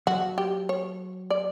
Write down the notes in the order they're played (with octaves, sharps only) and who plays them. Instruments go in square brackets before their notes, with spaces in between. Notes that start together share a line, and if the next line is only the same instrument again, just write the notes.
[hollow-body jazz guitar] F#3 [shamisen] F#4
[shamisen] G4
C#5
D5